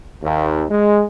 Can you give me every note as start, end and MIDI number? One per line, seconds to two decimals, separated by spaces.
0.23 0.64 39
0.70 1.03 56